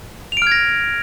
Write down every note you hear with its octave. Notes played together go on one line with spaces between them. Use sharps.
F6 G#6 A#6 D7 F7